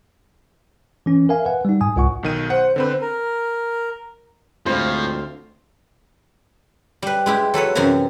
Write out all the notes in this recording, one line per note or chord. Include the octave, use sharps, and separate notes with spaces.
E3 C#4
A#4 E5 F5 G#5
B4 F#5
G3 D#4
G#2 G#5 D#6
C2 F4 F#5 C#6
B1 D#3 D#7
C5 F#5
D3 C4 B4 C5
A#4
D2 A2 G#3 C4 F4 C5 F5
G3 B4
G#3 E4 G4
F#3 A4 B4 C#5
F#2 C3 E3 G#5 A#5